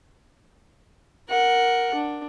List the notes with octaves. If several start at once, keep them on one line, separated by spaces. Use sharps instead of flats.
A#4 F#5
D4